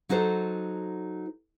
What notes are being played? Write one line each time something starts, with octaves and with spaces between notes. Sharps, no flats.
F#3 D#4 F#4 A4 C5